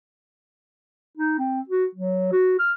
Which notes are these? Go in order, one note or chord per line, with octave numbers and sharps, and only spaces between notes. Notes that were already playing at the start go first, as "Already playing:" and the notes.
D#4
C4
F#4
F#3
F#4
F6